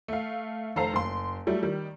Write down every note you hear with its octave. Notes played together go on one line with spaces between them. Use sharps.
A3 F5
F1 A4 C5 F5 A#5 C7
F#1 C6
F#3 G3 A3
D#3 G3